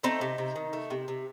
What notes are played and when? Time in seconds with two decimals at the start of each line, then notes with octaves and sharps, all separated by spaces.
0.03 A3 C4 D#4
0.21 C3
0.38 C3
0.56 D#3
0.73 A3
0.90 C3
1.08 C3